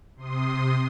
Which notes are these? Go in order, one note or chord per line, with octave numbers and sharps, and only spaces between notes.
C3 C6 D#6